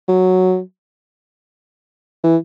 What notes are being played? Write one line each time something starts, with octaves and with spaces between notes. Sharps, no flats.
F#3
E3